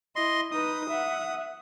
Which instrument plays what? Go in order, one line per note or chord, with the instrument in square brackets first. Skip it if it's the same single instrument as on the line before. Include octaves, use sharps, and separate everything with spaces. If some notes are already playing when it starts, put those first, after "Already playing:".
[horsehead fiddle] E4 [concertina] D#5 C6
[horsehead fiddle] D#4 B4 [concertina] D#6
[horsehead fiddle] E5 F#5